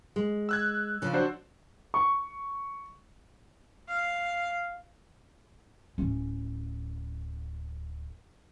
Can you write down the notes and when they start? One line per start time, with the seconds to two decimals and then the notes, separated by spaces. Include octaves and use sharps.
0.16 G#3
0.49 E6 F#6 G#6
1.02 C#3 F3
1.13 D4 F#4 C5
1.94 C#6
3.88 F5
5.98 D1 C#4